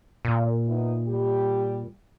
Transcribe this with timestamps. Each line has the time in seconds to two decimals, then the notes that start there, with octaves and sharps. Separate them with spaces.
0.25 A#2
0.68 B3 D#4 E4
1.08 G3 G4